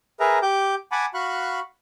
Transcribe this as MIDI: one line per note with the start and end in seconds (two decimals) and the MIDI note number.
0.20 0.39 68
0.20 0.39 70
0.20 0.39 71
0.20 0.39 76
0.20 0.39 82
0.42 0.75 67
0.42 0.75 86
0.42 0.75 91
0.92 1.06 78
0.92 1.06 80
0.92 1.06 81
0.92 1.06 83
0.92 1.06 86
1.14 1.60 66
1.14 1.60 77
1.14 1.60 83
1.14 1.60 85
1.14 1.60 90